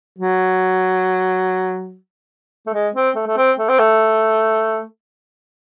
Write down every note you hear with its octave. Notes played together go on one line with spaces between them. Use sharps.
F#3
A3
G#3
C4
A3
A3
C4
A3
C4
A3